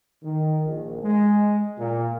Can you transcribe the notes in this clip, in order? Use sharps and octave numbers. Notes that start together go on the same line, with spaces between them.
D#3
A#1
G#3
A#2